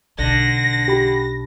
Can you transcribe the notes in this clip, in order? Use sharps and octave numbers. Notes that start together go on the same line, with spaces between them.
B1 D3 A#6
G4 B5